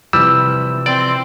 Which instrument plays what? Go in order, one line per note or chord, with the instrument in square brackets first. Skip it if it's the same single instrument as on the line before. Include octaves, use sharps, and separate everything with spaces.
[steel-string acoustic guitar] C3 E3 F3 [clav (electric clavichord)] G3 [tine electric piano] E6
[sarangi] C4 [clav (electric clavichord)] D5